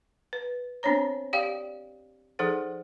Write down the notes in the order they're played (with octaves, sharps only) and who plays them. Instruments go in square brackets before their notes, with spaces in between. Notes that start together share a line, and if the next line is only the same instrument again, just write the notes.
[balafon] B4
B3 C4 D4 C5 C#5 A#5
G4 D5 F5 G5
F3 D#4 G#4 A4 C5 F#5